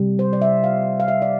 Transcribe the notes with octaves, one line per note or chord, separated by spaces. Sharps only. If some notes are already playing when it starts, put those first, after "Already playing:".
Already playing: C3 G3
C5
D5
E5
F5
F5
E5
D5